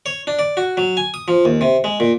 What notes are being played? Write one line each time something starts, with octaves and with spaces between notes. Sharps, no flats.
C#5
D4
D5
F#4
F#3
G#5
D#6
F3
D#2
C3
G#3
A#2